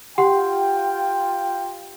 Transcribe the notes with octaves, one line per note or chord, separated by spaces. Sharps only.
F4 G4 F#5 G5 C6